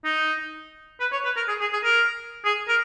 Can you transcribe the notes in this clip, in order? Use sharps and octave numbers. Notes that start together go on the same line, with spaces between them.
D#4
B4
C#5
B4
A#4
G#4
G#4
G#4
A#4
G#4
A#4